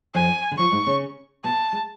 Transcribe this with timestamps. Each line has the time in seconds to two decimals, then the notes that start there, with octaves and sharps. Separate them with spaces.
0.15 F2 F3 G#5
0.51 D3
0.58 F2 F3 C#6
0.72 G#2 G#3
0.87 C#3 C#4
1.44 B2 B3 A5
1.73 G#3